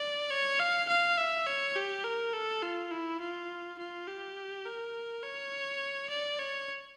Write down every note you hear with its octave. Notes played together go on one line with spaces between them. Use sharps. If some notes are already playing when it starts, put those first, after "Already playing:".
Already playing: D5
C#5
F5
F5
E5
C#5
G4
A#4
A4
F4
E4
F4
F4
G4
A#4
C#5
D5
C#5